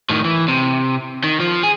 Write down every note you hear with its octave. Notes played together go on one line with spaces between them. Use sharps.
A2 D#3
E3
C3
D#3
F3
G#4